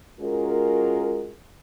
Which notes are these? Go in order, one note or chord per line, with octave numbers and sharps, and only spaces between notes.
G#3 C#4 F4 F#4 A#4